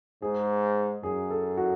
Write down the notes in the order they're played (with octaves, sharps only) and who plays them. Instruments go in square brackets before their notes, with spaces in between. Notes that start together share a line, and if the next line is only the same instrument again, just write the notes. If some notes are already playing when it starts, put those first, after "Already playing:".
[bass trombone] G#2 [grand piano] G#4
[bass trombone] F#2 [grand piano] G#4
[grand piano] A4
F#4